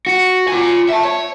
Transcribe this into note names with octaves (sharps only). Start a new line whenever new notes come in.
F#4
F4 G#5
E5 A5
C#5